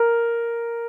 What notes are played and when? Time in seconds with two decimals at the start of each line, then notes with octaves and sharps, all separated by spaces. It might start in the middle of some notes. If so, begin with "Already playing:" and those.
Already playing: A#4